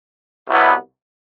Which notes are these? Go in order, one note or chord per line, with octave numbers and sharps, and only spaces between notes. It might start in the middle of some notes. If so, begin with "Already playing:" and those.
C2 B2 F#3 B3 E4